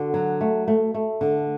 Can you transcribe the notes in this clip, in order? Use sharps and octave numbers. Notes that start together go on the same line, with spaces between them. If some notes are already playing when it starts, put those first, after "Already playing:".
Already playing: D3 F#4
F#3
A3
A3
A3
D3